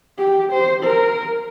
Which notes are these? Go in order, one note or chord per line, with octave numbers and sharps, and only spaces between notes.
G4
C5
A#4